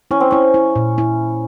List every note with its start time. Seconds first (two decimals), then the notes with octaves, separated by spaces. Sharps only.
0.11 C#4 E4
0.20 C4
0.31 C#4 E4
0.54 E4
0.76 A#2
0.98 E4